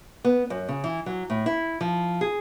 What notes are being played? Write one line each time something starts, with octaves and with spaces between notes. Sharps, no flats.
B3
F#2
C#3
E3
F#3
A2
E4
F3
G#4